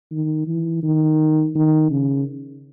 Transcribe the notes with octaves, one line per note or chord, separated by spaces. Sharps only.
D#3
E3
D#3
D#3
C#3